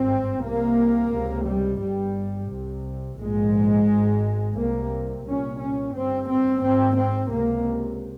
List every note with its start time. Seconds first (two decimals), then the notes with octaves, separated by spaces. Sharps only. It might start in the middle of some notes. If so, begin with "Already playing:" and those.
Already playing: G#1 G2 C4
0.44 C2 C3 A#3
1.13 C#2 C3
1.47 G3
1.82 G1 G2 G3
2.50 C2 C3
3.19 A#1 G#2 G#3
3.88 G#1 G#2
4.56 C2 C3 A#3
5.25 C2 A#2 C#4
5.60 C#4
5.94 G1 G2 C4
6.28 C4
6.62 G#1 G#2 C4
6.97 C4
7.31 C#2 C3 A#3